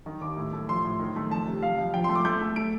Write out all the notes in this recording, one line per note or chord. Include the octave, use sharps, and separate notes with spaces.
D#3
D#2 D6
A2
A3
F3 C6
A2
D#3
A3
F2 A5
C3
F2 F5
F2
F3 G5
A3 C6
D6
A3 G6
A3
A3 D7